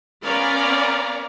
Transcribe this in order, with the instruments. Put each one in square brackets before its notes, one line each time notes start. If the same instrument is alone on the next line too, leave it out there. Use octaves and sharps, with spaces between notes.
[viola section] B3 C#4 A#4 D5 F5 A#5